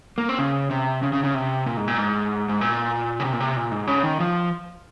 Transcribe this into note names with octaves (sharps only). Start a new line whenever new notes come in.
A#3
C4
C#3
C3
C#3
C#3
C#3
C3
A#2
G#2
A#2
G#2
G#2
A#2
C#3
C3
A#2
C3
A#2
G#2
C#3
D#3
F3